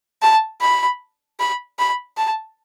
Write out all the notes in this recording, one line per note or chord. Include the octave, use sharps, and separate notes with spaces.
A5
B5
B5
B5
A5